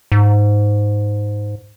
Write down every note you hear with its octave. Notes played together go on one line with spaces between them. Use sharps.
G#2